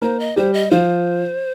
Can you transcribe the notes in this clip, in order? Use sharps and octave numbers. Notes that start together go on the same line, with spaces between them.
A#3 A#4 C5
D#5
G3 G4 C5
D#5
F3 F4 C5